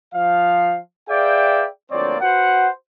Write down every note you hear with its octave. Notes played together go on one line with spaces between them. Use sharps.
F3 F5
G#4 B4 D5 E5 F5 G5
D2 F3 A#3 C4 C#5 D5
F#4 B4 C5 F#5